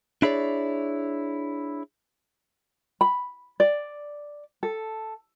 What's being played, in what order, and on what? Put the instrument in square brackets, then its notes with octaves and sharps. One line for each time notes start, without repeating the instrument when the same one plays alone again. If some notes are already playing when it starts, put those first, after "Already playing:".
[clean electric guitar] D4 E4 G#4 C#5 D5
[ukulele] B5
D5
A4